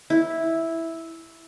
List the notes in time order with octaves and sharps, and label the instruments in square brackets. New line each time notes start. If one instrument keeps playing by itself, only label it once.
[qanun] E4